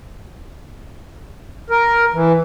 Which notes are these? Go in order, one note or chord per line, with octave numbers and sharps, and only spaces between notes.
A#4
E3